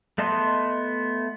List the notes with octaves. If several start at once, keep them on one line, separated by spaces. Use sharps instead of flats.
A3 B3 D#5 A5 C6